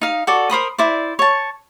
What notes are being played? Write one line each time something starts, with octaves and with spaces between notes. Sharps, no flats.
D#4 F5
F#4 A4 D5
A#4 C5 B5 D#6
E4 C5 D5
C#5 A5